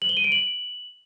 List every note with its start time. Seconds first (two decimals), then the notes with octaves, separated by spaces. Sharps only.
0.02 F#7
0.09 G7
0.17 D#7
0.24 D7
0.32 F#7